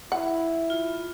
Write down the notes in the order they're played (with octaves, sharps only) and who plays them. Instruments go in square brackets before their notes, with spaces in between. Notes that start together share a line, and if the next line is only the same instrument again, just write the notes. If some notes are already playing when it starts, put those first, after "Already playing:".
[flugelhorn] E4 [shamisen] F#5
[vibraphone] F4